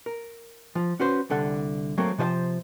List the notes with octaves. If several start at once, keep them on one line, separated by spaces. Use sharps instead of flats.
A#4
F3
C#4 F#4 B4 C5
C2 D3 A4 F#5
F#3 A3 A#3 C4
C3 F3 C5 E5 A5